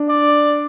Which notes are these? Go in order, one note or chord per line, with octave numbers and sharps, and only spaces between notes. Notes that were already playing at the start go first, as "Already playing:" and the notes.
Already playing: D4
D5